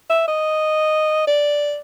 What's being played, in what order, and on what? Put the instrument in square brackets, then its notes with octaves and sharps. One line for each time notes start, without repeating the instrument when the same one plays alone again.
[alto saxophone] E5
D#5
D5